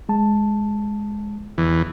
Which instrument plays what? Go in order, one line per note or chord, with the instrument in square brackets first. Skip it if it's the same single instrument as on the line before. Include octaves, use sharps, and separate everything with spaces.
[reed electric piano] G#3 A5
[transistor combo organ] E2